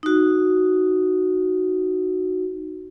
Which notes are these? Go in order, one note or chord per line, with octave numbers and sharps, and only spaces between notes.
D#4 F#4